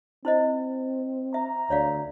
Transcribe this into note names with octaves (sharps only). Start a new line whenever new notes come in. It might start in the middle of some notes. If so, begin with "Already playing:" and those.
C4 E4 C5 D#5
E5 A#5
D2 C#5 D5 F5